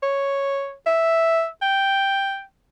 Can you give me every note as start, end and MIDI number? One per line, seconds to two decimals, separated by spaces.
0.03 0.73 73
0.86 1.47 76
1.62 2.42 79